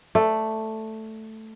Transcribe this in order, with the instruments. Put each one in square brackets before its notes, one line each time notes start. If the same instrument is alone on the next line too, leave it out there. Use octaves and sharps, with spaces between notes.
[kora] A3 D5